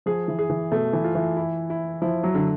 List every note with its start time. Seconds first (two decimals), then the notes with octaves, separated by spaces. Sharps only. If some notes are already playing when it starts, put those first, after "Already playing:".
0.06 F3 G#4
0.28 E3
0.39 G#4
0.50 E3
0.71 B2 A3
0.93 E3
1.04 F4
1.15 E3
1.37 E4
1.70 E4
2.02 F3 E4
2.24 F#3
2.34 D3